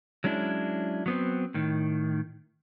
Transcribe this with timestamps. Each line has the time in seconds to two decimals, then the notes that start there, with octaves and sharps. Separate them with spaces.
0.24 F#3 G#3 C#4 D4 E4
1.06 F#3 B3 C4
1.54 A2 D#3